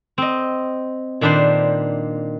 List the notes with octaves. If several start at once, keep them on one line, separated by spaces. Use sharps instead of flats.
C4 D#5
A#2 D#3 D4 B4 C5